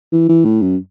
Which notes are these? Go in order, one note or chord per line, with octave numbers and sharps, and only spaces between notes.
E3
E3
A2
F#2